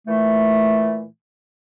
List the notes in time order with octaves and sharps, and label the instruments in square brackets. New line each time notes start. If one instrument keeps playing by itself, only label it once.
[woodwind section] A#2 E3 A3